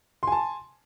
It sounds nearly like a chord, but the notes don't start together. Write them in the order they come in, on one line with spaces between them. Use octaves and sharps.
C6 G#5 A5